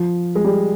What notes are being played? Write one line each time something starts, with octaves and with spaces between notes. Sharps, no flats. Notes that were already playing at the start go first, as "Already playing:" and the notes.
Already playing: F3
G#3
G3